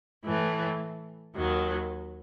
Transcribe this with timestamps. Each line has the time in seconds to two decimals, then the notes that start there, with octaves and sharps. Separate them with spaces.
0.25 A2 E3 A3
1.35 D#2 D#3 F#3